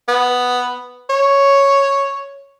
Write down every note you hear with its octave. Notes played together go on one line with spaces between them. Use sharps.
B3
C#5